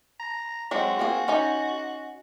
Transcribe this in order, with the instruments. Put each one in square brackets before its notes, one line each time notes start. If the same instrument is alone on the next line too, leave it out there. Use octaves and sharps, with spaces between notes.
[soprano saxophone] A#5
[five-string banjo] F#3 G#3 C4 [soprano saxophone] F#4
[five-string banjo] A#3 C4 G#4
C#4 D#4 G#5